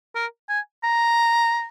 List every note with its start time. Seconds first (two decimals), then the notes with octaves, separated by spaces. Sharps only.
0.15 A#4
0.49 G#5
0.84 A#5